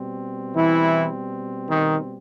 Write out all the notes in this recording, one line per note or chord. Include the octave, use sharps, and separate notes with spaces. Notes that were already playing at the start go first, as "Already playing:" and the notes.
Already playing: B2 G3 C4
E3 E4
D#3 D#4